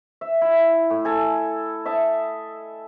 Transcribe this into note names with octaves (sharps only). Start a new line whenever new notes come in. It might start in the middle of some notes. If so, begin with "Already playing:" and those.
E5
E4
A2
A4 G#5
D#5 E5 A5